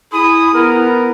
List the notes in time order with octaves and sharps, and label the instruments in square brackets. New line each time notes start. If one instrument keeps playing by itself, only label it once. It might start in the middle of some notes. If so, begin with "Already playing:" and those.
[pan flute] E4 [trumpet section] G#4 B5 D#6
[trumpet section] B3 A#4